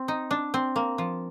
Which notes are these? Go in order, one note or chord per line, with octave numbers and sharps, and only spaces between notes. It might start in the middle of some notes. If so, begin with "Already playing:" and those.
Already playing: C4
D#4
D4
C4
A#3
F3